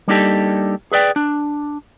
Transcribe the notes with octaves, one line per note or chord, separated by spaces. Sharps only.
G3 A#3 D4 D#4 G4 A4
G#4 B4 D5 G5
D4